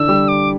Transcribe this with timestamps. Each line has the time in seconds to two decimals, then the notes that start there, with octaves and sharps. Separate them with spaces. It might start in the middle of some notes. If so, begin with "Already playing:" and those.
Already playing: D3 E3 D4 E4 E6
0.08 G3 G4
0.28 D6